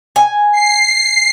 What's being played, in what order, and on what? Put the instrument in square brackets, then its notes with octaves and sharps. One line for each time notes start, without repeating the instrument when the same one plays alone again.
[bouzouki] G#5
[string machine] C7